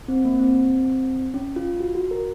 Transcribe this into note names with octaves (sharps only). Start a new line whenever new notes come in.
C4
A#3
C4
C#4
F4
F#4
F#4
A#4